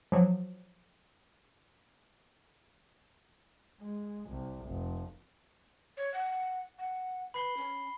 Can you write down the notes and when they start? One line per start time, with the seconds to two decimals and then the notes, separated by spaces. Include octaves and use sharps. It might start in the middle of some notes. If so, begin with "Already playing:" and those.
0.12 F3 F#3
3.80 G#3
4.29 C2
4.66 F1
5.97 C#5
6.14 F#5
6.78 F#5
7.34 B4 B5 C7 G7
7.57 C#4